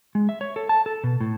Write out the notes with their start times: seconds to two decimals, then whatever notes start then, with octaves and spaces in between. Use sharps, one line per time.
0.15 G#3
0.29 E5
0.41 C#5
0.56 A4
0.69 A5
0.86 A4
1.04 B2
1.21 A2